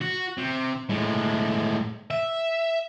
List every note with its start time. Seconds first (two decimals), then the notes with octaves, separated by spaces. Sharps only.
0.01 F#4
0.37 C3
0.89 A2 G#3
2.11 E5